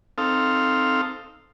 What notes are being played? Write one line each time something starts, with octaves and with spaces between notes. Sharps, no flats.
C4 D#4 A4 F5